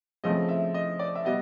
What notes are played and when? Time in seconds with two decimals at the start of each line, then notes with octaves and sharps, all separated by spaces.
0.24 C#3 F3 A3 C4 D#5
0.49 E5
0.74 D#5
0.99 D5
1.15 E5
1.25 G3 B3 D#5